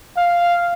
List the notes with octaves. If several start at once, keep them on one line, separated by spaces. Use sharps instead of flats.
F5